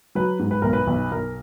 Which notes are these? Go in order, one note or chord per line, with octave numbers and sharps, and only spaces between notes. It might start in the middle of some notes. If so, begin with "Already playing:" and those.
F#3 B4
G#2
B4
B1 A#4
B4
B1
B1 A#4